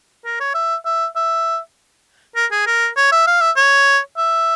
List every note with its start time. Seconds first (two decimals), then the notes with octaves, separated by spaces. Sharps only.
0.25 A#4
0.40 C#5
0.54 E5
0.85 E5
1.16 E5
2.35 A#4
2.51 G#4
2.67 A#4
2.97 C#5
3.12 E5
3.27 F5
3.41 E5
3.56 C#5
4.17 E5